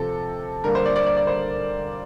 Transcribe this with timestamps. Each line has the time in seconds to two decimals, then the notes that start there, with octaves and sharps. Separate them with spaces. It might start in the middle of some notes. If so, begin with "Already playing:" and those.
Already playing: C3 F3 C4 A4
0.64 D3 G3 A#3 A#4
0.75 C5
0.85 D5
0.96 D5
1.06 D5
1.17 D5
1.27 C5